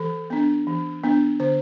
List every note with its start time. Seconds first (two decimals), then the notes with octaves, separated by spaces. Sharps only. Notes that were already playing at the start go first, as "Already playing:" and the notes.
Already playing: E3 A4
0.30 B3 D4
0.67 E3
1.03 B3 D4
1.40 D3 C5